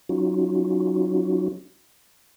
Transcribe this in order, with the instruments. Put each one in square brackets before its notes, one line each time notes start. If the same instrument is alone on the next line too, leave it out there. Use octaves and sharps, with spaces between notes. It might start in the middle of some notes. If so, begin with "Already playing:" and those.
[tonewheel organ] F#3 C#4 D#4 F4 F#4